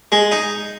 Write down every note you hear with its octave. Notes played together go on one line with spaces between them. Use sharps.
G#3
D#4